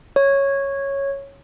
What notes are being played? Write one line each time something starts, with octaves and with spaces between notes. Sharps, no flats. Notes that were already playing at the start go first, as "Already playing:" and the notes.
C#5